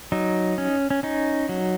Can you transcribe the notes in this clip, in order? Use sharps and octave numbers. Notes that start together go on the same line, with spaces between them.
F#3 D#4
C#4
C#4
C#4 D#4
F#3